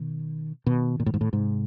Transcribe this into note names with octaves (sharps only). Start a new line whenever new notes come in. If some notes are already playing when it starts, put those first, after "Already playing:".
Already playing: B2 D#3
B2 D#3
A#2
A2
G#2
A2
G#2 C3